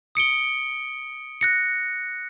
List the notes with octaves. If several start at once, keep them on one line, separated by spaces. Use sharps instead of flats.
D#6 C#7 D7 G7
F#6 A#6 C#7